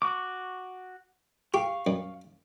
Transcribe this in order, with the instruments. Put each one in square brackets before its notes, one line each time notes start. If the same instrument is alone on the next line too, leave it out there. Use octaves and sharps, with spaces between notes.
[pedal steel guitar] F#4 C#6 D6
[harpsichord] G4 [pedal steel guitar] F5 C#6
[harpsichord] F#2